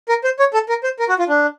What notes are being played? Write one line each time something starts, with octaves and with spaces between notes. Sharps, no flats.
A#4
C5
C#5
A4
A#4
C5
A#4
F#4
F4
D4